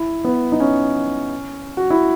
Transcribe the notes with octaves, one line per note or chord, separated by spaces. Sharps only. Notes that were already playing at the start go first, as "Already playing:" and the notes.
Already playing: E4
B3
D#4
C#4
F#4
E4